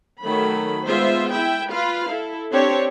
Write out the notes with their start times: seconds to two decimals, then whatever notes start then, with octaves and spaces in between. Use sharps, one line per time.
0.23 D#3 F#3 A3 B5
0.88 G#3 B3 F4 C5 E5
1.31 E4 E5 G5
1.72 F4 B4 F5
2.09 E4 A4
2.52 C4 D4 G4 C#5